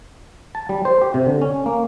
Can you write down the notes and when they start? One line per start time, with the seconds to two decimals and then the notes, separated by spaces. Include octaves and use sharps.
0.55 A5
0.69 G3
0.85 C5
1.02 G4
1.14 C3
1.26 D3
1.42 C#4
1.66 A#3